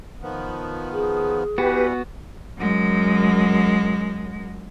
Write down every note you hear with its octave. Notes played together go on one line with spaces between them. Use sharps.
D#3 F3 B3
G#4
E3 G3 B3 F#4 G4 B4
F#2 G#3